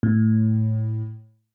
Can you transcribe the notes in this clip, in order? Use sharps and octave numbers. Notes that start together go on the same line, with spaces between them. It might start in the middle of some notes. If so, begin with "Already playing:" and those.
A2